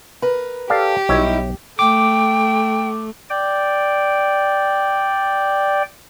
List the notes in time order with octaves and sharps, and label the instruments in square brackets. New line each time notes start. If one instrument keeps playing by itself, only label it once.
[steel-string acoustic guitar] A#4 B4
[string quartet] G4 [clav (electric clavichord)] A4 D5 F5
[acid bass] B1 [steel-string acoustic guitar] G3 D#4 E4 [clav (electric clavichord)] C#5 E5
[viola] A3 [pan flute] G5 [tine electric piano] D6
[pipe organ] D5 G5